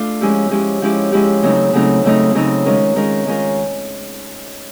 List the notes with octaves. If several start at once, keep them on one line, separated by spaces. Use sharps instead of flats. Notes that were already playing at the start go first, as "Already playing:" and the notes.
Already playing: A3 D4 F4
F3 G#3 C#4 E4 G4
F3 G#3 C#4 E4 G4
F3 G#3 C#4 E4 G4
F3 G#3 C#4 E4 G4
C#3 F#3 A3 C4 D#4
C#3 F#3 A3 C4 D#4
C#3 F#3 A3 C4 D#4
C#3 F#3 A3 C4 D#4
D#3 G#3 C#4 F4 A#4
D#3 G#3 C#4 F4 A#4
D#3 G#3 C#4 F4 A#4